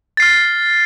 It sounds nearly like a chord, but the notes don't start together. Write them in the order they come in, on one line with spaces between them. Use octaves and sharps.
A6 C7 F6